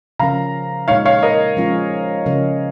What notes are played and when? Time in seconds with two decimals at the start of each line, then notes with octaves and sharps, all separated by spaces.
0.19 C#3 F3 C#4 A#4 F5 A#5
0.88 A#2 G#3 D#4 C#5 F5
1.05 C#5 F5
1.23 A#4 D#5
1.57 F3 G#3 C#4 F4
2.26 C#3 F3 C#4 A#4